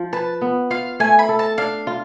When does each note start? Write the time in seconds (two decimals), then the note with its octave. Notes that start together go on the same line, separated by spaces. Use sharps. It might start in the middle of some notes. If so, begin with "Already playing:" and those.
Already playing: F3
0.13 B4 A5
0.41 B3
0.70 F4 F5
1.00 A3 G#5
1.19 B5
1.29 A4
1.39 A5
1.58 D4 F5
1.87 F4